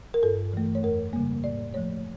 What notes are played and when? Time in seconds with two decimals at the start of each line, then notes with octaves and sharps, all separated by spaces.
0.14 A#4
0.22 G2 A4
0.53 E3 A3
0.75 C#5
0.83 F2 A#4
1.13 C#3 G3 A#3
1.43 A2 D5
1.74 F3 A3 C#5